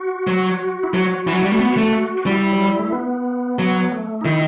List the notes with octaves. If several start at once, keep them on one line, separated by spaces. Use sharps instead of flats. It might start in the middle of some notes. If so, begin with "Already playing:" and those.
Already playing: F#4
F#3
E4
F#3 F#4
E3
F#3
G3
A3
B3
A3
G3 E4
F#3
G3
A3
B3
F#3
A3
D#4
D#3 E4